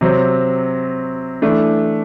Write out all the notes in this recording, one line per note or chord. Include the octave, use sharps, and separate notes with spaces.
C3 F#3 C4
E3 A3 D4